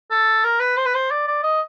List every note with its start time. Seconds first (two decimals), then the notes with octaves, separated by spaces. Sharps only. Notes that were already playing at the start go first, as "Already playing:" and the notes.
0.11 A4
0.44 A#4
0.60 B4
0.77 C5
0.85 B4
0.95 C5
1.11 D5
1.28 D5
1.43 D#5